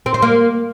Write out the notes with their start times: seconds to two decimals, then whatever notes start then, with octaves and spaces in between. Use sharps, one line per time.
0.06 C4
0.14 C5
0.22 A#3